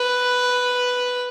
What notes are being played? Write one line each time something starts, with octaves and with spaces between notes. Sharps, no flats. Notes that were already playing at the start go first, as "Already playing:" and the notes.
Already playing: B4